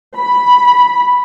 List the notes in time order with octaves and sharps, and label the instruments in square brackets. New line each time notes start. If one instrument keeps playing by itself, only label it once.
[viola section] B5